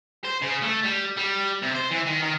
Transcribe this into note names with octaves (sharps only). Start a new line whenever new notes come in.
C5
C#3
A3
G3
G3
C3
C5
E3
D#3
D#3